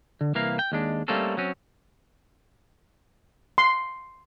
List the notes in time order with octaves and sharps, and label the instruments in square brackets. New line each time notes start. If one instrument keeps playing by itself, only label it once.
[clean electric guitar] D3
C2 E3 A#3 F5
G5
D#2 G#3 D4
G3 A3 A#3 C4 C#4 A4
F#3 C4 C#4
[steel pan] C6